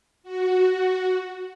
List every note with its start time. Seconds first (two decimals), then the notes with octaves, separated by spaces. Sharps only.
0.23 F#4